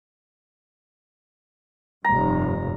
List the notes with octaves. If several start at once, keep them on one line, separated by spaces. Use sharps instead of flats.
F1 G2 A#5